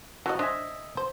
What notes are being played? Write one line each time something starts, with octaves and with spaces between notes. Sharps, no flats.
E3 F3 F#4 D#5
D4 C5 D#5 E5 G#5
C5